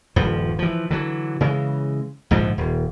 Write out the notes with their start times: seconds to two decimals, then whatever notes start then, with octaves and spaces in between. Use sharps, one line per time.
0.16 D#1 G2 F3
0.59 E3 F3
0.91 D3 E3 F#3
1.41 C#3 E3 G#3
2.31 A#1 G#2 D3 F3
2.58 D#1